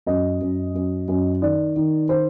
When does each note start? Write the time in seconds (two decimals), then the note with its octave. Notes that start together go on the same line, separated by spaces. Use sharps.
0.06 F#2 D#5
0.41 F#2
0.75 F#2
1.08 F#2
1.41 D#3 D5
1.76 D#3
2.09 D#3 C5